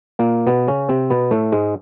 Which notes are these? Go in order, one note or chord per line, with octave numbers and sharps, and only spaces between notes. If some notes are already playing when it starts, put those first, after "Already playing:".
A#2 A#3
B2 B3
C#3 C#4
C3 C4
B2 B3
A2 A3
G#2 G#3